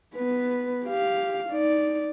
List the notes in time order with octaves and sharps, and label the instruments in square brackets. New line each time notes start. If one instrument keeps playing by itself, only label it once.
[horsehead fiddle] B3 B4
G4 F5
D#4 D5